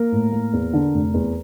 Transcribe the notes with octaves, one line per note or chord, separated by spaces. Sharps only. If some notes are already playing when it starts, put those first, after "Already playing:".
Already playing: A#3 A#4
A2
A#3
E2
D3
F1
E2